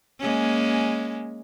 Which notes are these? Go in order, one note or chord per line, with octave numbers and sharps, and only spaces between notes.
G#3 A#3 C#4